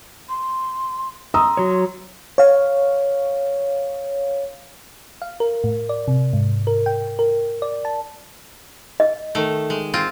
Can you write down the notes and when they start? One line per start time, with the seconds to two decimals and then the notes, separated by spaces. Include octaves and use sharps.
0.29 C6
1.34 A#5 C6 D#6 E6
1.57 F#3 C#5
2.38 C#5 F5
5.22 F5
5.40 A#4
5.64 A2
5.89 D5
6.08 C3
6.33 G#2
6.67 A#4
6.86 G5
7.19 A#4
7.62 D5
7.85 A5
9.00 D#5
9.35 D#3 A3
9.70 G#3
9.94 C4 F4